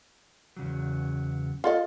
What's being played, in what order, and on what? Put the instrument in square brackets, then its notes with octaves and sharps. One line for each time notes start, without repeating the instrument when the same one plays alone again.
[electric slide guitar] E2 C#3 F#3
[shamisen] F4 A4 D#5